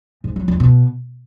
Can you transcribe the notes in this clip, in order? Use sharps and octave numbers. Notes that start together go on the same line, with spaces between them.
G#2
F#3
F2
B2